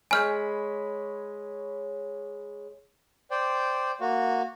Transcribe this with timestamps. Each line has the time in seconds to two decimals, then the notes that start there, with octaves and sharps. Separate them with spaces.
0.11 G#3 C#5 G#5 B5 F6 G6
3.31 C5 D5 G5
4.01 A#3 F#4